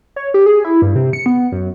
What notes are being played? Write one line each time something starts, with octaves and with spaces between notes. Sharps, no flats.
C#5
G4
G#4
E4
G2
C3
C#7
B3
F#2